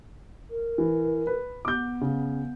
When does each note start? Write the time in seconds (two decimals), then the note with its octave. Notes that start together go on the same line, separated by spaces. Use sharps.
0.50 A#4
0.78 E3
1.27 B4
1.65 B3 D6 G6
2.01 C#3